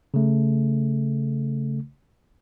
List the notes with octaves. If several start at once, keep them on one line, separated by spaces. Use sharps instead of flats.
C#3 A3